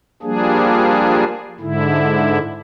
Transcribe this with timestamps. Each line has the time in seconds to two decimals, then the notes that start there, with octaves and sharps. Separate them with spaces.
0.22 F3 G3 A#3 D4 G#4
1.60 G#2 D3 E4